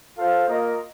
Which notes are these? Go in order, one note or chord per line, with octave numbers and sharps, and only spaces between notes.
F4 A4 C5 F5
A#3 F4 A#4 D#5